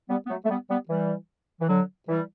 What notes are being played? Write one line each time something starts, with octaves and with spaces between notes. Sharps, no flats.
G3 B3
B3
F#3 A3
A3
G3 B3
G3 B3
E3 G3
E3
D3 F#3
E3 G3